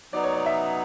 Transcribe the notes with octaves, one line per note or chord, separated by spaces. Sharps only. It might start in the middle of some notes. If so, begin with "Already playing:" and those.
F#3 B3 D#4 D5
C#5
D5
E5